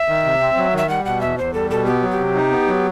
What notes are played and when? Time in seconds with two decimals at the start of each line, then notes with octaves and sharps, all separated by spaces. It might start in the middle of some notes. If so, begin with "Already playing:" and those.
Already playing: E5
0.08 D#3
0.24 C3
0.41 C4
0.57 F#3
0.73 D#3 E5
0.89 G3 F#5
1.05 B2 F#5
1.21 E2 E5
1.38 E2 C5
1.54 G3 A4
1.70 B2 A4
1.86 B3 G4
2.02 F#3
2.11 G4
2.19 C3
2.35 D#4
2.51 B3
2.67 F#3